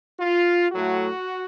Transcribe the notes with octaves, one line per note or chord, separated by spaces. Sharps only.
F4
A2 F#3 A3 F#4